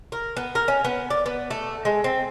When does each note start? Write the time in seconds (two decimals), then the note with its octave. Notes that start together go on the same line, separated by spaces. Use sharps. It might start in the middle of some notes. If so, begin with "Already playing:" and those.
0.12 A#4
0.37 B3
0.55 A#4
0.68 C#4
0.85 B3
1.10 D5
1.26 B3
1.50 A3
1.85 G#3
2.04 C4